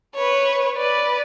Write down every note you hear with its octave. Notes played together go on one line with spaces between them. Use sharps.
B4 C#5
B4 D5